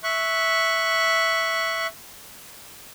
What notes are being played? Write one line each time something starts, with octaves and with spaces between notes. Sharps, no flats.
E5 C#6 F#6